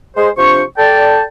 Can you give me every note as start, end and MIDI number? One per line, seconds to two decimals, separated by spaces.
0.17 0.29 56
0.17 0.29 68
0.17 0.29 72
0.37 0.62 48
0.37 0.62 53
0.37 0.62 62
0.37 0.62 72
0.37 0.62 85
0.78 1.22 69
0.78 1.22 74
0.78 1.22 79
0.78 1.22 81